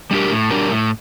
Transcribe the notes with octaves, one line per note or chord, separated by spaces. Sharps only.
G3 D4 G4 A#4
A2
G3 D4 G4 A#4
A2